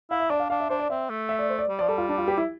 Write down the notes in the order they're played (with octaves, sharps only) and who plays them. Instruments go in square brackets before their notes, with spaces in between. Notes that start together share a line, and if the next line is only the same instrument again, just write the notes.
[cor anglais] E4 [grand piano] F5
[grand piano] E5
[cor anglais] D4 [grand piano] D5
[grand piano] F5
[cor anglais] D4 [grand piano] F5
[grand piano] E5
[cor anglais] D4 [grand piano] C5
[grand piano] D5
[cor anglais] C4 [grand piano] E5
[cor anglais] A3
[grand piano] E5
D5
C5
D5
[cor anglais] G3
[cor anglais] F3 [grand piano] D5
[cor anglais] G3 [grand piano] A4
[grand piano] F4
D4
F4
G4
E4